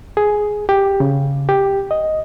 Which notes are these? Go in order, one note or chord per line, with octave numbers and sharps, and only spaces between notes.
G#4
G4
C#3
G4
D#5